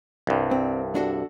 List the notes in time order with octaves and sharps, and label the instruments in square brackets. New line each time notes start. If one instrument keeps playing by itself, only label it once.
[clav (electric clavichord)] C2 G2
[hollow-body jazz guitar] C4
D4 F#4 A4